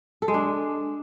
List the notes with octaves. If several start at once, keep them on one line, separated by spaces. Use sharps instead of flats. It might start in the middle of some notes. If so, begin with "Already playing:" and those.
A4
G#3
D4